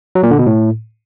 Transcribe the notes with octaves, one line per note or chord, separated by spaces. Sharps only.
F#3
A#2
D3
B2
A2